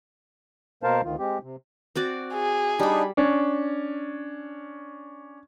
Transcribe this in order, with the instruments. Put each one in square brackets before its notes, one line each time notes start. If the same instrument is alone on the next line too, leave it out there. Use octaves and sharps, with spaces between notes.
[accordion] B2 A#3 A#4 C5 F5 A5
D2 D#3 F4
G#3 C4 G4
C3
[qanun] C4 F#4 D5
[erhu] G#4
[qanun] G3 B5 [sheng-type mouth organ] D4 D#4
[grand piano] C#4 D4